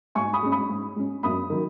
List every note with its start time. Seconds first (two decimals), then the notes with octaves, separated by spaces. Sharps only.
0.15 G#2 G#5 C#6
0.33 B5 D#6
0.43 G#3 C#4
0.52 B5 D#6
0.69 G#2
0.96 G#3 C#4
1.23 F#2 B5 D#6
1.50 D#3 F#3